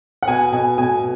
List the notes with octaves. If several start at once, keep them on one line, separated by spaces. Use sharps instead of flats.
F#5
B2 G#5
B2 G#5
B2 G#5